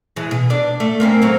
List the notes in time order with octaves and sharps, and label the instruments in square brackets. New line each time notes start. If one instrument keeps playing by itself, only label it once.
[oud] E3 G#3
B2
D4 D5
A3
A#3 C4 C#4
F#3 C4